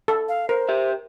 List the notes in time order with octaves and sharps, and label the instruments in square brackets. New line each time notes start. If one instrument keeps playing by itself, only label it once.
[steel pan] A4
[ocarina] F5
[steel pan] A#4 [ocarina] C5
[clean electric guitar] G4 E5